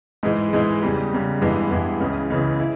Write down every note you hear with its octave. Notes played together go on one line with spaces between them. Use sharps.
G#2 E3 G#3
G#2 E3 G#3
E2 C#3 G3
E2 C#3 G3
G2 E3 G#3 B3
G2 E3 G#3 B3
C#2 C#3 E3
C#2 C#3 E3
E4